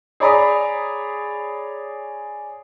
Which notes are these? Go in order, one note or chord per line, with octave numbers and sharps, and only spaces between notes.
G#4 C#5 D5 A#5 B5 D#6